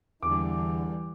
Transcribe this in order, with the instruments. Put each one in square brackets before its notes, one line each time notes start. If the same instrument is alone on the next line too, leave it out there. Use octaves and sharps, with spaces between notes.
[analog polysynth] E2 D3 [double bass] E3 G3 [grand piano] D6